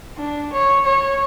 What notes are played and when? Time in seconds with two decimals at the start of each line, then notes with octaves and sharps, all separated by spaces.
0.17 D4
0.53 C#5
0.86 C#5